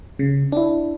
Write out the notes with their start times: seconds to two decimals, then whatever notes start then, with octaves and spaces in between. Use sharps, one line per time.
0.19 C#3
0.52 D4 E4